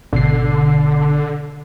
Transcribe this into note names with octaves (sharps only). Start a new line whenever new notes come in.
G#1 B2 D3 C7